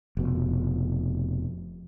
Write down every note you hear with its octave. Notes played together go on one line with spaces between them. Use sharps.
F1 B2